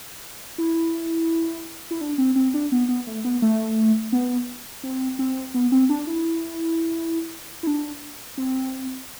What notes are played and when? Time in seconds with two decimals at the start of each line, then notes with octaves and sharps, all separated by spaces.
0.58 E4
1.91 E4
2.01 D4
2.18 C4
2.36 C4
2.54 D4
2.72 B3
2.89 B3
3.07 A3
3.25 B3
3.42 A3
4.12 B3
4.84 C4
5.19 C4
5.54 B3
5.72 C4
5.89 D4
6.07 E4
7.63 E4
7.67 D4
8.38 C4